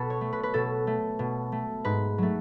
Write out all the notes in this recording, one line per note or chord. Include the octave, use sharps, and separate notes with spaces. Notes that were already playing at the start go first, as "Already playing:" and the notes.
Already playing: B2 A4 B4
C#5
A3
B4
B4
B2 A4
A3
B2
A3
G#2 B4
F#3 A3